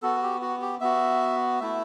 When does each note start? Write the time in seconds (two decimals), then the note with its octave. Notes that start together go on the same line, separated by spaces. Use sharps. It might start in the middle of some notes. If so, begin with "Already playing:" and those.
0.02 B3 F#4 A4
0.22 G4
0.42 F#4
0.61 G4
0.81 B3 F#4 E5
1.60 A3 E4 E5